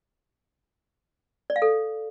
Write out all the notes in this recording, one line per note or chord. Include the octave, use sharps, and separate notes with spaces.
D5
F5
A4